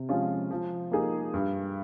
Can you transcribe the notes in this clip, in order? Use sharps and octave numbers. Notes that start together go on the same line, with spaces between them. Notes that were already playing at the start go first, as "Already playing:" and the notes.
Already playing: C3
F3 G#3 C#4 F4
F3
A#3 D#4 G#4
G2